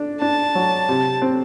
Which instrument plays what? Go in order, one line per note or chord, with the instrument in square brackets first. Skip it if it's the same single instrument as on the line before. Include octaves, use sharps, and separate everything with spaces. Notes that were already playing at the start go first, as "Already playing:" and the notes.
Already playing: [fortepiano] D4
[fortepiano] D4 [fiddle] A5
[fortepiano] F#3
C3
C4